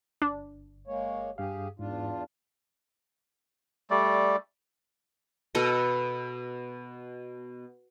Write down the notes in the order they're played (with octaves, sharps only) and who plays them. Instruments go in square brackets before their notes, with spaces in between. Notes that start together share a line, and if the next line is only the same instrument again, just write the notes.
[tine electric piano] G1 [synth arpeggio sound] D4
[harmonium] G#3 A#3 C#5
[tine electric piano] G2 F5 [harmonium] G4 G#4
[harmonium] E2 D4 F4 [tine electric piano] G#2
[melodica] G3 A3 D5
[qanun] B2 B3 A4 D#5